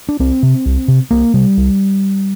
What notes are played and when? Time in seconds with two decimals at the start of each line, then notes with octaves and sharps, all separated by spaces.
0.09 D4
0.19 C2 C4
0.43 C3
0.66 C2
0.88 C3
1.11 C2 A#3
1.34 C3 G3
1.57 C2